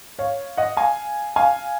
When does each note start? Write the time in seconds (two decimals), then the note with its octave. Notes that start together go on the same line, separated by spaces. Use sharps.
0.19 C#5 F5
0.58 D#5 F#5
0.77 F5 G#5
1.36 F5 G#5